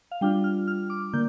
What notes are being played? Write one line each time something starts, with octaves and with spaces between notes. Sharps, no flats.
F5
G3 D4 F4 G5
F6
F6
D6
D3 A#3 G6